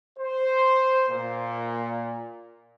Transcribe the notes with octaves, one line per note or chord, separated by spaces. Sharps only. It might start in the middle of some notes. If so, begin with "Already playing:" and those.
C5
A#2